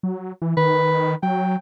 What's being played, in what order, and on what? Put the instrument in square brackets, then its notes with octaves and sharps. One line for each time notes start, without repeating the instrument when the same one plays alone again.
[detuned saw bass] F#3
E3
[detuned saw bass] D#3 [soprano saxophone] B4
[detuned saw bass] F#3 [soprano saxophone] G5